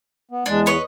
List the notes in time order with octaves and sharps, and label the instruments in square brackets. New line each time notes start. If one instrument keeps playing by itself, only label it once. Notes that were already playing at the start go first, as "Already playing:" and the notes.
[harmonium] B3
[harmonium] E2 [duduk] G#3 [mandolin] D4
[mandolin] B4 C#5 D#5